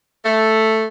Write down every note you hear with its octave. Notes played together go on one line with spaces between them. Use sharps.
A3